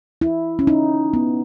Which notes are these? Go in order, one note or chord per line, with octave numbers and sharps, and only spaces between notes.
E4
C#4
D#4
B3